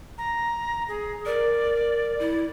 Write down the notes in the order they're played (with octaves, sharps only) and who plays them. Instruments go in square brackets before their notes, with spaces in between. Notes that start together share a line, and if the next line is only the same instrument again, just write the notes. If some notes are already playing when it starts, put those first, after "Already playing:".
[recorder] A#5
G#4
[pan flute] A#4 [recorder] D5
[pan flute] E4